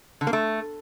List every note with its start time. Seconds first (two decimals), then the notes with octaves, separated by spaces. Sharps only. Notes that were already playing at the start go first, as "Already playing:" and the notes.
0.21 D3
0.27 A#3
0.33 A3